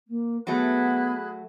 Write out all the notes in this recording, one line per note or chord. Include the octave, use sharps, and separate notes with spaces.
A#3
F#3 A3 B3 G#4 B5 F#6